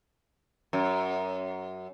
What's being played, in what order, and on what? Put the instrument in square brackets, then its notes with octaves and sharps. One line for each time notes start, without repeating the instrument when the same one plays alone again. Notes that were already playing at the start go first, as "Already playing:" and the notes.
[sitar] F#2